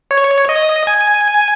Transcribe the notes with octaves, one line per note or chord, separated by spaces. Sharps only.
C#5
D#5
G#5